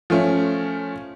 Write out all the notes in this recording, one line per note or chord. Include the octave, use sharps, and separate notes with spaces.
F3 A3 C#4